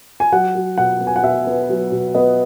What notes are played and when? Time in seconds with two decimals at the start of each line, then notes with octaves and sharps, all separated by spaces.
0.20 G#5
0.32 F#3 F#5
0.55 F#3
0.78 B2 F#5
1.01 B3
1.07 G#5
1.16 F#5
1.23 B2 E5
1.47 B3
1.69 F#3
1.92 B2
2.15 B3 D#5